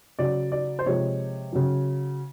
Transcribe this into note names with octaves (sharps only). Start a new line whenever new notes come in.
C#3 F#3 D5
D5
C5
C3 F3 G#3 C#5
C#3 F#3